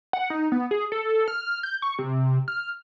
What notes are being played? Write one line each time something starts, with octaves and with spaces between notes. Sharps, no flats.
F#5
D#4
B3
G#4
A4
F6
G6
C#6
C3
F6